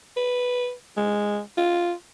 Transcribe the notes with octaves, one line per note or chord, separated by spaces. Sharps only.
B4
G#3
F4